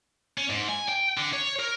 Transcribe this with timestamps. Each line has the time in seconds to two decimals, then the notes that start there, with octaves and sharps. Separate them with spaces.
0.38 C#4
0.50 G#2
0.69 G#5
0.89 G5
1.18 D3
1.33 C#5
1.60 A#4